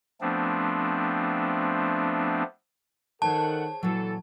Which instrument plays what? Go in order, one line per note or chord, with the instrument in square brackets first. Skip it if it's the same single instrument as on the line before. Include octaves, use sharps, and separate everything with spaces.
[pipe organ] F3 A3 B3 C4 D4
[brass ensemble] D#3 A4 F#5 [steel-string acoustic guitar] G#4 C5 C#5 [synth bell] A5
[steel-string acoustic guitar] A#2 F#3 [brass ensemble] E3 A4